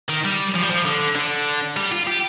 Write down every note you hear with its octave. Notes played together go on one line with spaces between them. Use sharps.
D#3
G3
F3
G3
F3
D3
D3
G3
F4
G4